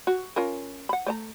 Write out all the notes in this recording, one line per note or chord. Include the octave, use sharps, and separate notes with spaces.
F#4
C#4 F4 A#4
F#5 B5
A3 D5 A#5